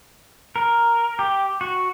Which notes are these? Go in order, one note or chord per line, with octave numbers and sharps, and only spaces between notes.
A#4
G4
F#4